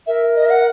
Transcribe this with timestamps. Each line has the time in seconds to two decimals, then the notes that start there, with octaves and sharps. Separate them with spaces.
0.07 A#4 E5
0.36 D#5
0.46 E5
0.50 F#5